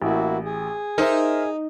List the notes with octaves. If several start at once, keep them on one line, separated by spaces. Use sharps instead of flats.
A1 A#3 E4 F#4
G#4
D#4 A#4 C5 E5